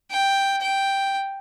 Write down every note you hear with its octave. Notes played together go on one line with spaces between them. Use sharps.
G5
G5